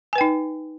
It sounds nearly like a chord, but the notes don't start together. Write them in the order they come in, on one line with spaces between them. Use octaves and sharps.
G#5 B4 G5 D#4